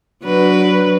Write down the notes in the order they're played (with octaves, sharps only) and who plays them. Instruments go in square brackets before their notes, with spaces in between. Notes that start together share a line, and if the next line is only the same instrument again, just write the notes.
[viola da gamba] F#3 D4 B4